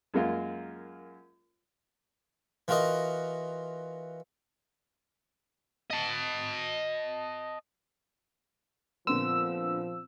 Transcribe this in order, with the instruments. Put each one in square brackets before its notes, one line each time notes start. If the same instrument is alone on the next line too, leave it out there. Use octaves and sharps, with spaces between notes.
[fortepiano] F#2 G#3 A#3 F4
[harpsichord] E3 F4 F#4 A#4 D#5
[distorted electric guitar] D#5 A5
[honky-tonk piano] A#2 D3 B3 [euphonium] F3 [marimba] C4 [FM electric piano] E6